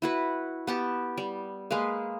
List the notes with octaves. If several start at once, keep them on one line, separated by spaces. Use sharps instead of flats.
E4 F#4 B4
B3 G4 A5
G3
G#3 A#3 B4 F5